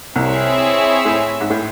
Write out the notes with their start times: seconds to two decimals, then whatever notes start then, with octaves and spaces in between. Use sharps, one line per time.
0.16 C2 C3 C4 E4 G#4 C#5 E5
1.05 A2
1.41 G#2
1.50 A2